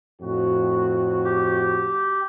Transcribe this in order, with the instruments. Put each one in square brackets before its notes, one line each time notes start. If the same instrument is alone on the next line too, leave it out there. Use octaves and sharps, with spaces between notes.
[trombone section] F2 A2 F#4
[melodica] G4